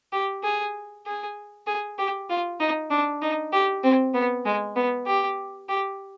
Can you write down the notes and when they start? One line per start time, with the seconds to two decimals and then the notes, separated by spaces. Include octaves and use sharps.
0.13 G4
0.44 G#4
1.06 G#4
1.67 G#4
1.99 G4
2.29 F4
2.60 D#4
2.90 D4
3.22 D#4
3.53 G4
3.84 C4
4.14 B3
4.45 G#3
4.76 B3
5.07 G4
5.69 G4